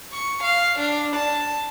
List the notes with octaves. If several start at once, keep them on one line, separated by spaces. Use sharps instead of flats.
C#6
F5
D4
A5